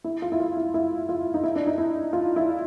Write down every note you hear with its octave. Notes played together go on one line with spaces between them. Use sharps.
E4
F4
E4
F4
E4
E4
F4
D#4
E4
D4
D#4
E4
F4
E4